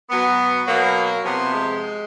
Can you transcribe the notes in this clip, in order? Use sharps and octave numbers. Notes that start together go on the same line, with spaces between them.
B2 F#3 B3
B2 F#3 A#3
C3 F3 B3
G#3